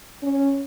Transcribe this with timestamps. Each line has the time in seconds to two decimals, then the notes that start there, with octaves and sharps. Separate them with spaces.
0.23 C#4